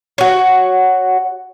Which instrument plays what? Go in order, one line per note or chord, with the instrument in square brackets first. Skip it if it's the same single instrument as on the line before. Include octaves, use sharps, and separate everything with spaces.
[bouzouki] F#4 C#5